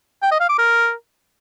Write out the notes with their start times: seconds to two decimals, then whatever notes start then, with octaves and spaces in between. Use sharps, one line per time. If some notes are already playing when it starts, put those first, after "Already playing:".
0.22 G5
0.31 D#5
0.40 F5
0.49 D6
0.58 A#4